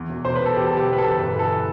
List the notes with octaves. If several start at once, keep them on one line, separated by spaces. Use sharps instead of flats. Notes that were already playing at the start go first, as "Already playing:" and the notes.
Already playing: E2
E1
E1 C5
E1 B4
A4
E1 G4
A4
D3 G4
E2
B4
E1 A4
G1 B4
E3 A4